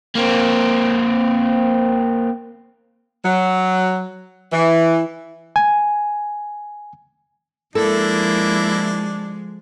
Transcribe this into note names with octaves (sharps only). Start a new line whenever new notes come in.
A#3 C4
F#3
E3
G#5
F3 G#3 A#3 D4 E4 A4